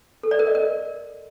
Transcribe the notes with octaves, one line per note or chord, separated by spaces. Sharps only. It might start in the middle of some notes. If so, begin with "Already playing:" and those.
A4
D5
A#4
D#5
A#4